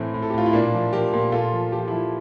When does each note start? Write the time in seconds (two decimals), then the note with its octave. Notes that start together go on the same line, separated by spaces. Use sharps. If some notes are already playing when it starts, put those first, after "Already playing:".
Already playing: A2 E3 A3 C4
0.14 A2
0.22 A4
0.30 G4
0.34 A2 F4
0.46 E4
0.53 A#2 A#3 D4
0.74 F3
0.93 F3 G4 A#4
1.13 A#2
1.32 A#2 F4 A4
1.53 F3
1.72 F3 G4
1.80 F4
1.88 F3 E4 G4